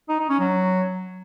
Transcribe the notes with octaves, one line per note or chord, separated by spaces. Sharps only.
D#4
D#4
C#4
F#3